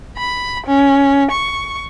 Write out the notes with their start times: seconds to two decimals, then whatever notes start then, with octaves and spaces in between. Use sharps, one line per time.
0.18 B5
0.67 C#4
1.31 C#6